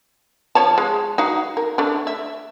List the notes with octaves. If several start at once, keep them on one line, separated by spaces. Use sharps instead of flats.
F3 C#5 A5
G#3
D#4 F#4 F5
A#4
A3 D4
E5